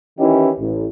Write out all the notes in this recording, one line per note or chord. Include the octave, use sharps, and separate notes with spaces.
D#3 E3 C#4 D#4 E4 G4
A1